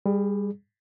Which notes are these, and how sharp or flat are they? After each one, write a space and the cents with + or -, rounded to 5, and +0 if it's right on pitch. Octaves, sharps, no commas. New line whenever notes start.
G3 +25 G#4 +0